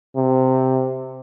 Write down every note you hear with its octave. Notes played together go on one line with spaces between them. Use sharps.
C3